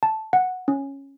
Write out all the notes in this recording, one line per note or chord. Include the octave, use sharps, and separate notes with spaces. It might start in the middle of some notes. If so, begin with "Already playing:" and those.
A5
F#5
C#4